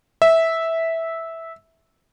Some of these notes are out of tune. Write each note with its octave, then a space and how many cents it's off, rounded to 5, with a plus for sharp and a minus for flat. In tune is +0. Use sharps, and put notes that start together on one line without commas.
E5 -10